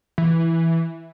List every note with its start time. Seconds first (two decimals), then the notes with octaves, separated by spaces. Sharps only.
0.18 E3